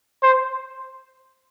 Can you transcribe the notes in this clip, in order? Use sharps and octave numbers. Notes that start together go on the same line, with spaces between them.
C5